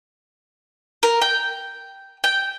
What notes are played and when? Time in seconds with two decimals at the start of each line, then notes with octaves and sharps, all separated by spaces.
1.03 A#4
1.22 G5
2.24 G5